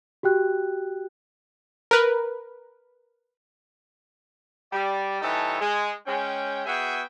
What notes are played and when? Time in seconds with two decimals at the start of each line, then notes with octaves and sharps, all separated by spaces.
0.23 F#4 G4 G5 F#6
1.91 A#4 B4
4.73 G3 D5
5.22 E3 G3 D#4 A4 C#5 A5
5.61 G#3
6.07 G#3 C#4 G5
6.66 B3 F#4 G#4 E5 G5 G#5